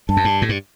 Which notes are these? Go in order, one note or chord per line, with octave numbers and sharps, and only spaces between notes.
G2 A5
F#2
G2
A2
G2